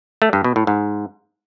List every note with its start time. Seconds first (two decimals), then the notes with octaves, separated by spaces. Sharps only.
0.22 A3
0.33 G2
0.44 B2
0.56 A2
0.67 G#2